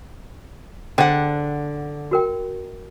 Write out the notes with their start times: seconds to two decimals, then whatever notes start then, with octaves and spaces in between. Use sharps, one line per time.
0.98 D3 G#4 C5 F#5 G5
2.11 F#4 A#4 G5